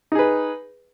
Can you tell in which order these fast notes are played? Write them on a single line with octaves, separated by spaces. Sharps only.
D#4 G#4 B4